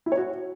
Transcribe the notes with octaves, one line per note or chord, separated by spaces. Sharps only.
E4
C#5
F#4